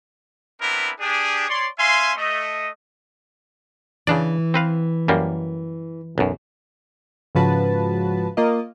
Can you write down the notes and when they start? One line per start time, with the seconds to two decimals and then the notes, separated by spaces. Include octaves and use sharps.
0.61 B3 C4 D4 E4 A#4 B4
1.00 D4 G4 G#4
1.49 C#5 D5 C6
1.78 C#4 E5 F5 G#5 C6
2.16 A3 D#5
4.07 C#3 E3 D4 D5
4.54 C4 B4 F5
5.08 F#2 G3 A#3
6.18 B1 F#2
7.35 G#2 C#3 F3 F#4 B4 A5
8.37 A#3 F4 D#5